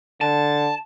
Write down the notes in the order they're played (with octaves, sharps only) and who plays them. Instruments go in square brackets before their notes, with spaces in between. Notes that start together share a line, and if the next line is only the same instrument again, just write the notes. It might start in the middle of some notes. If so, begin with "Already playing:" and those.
[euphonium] D3 [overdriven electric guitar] A5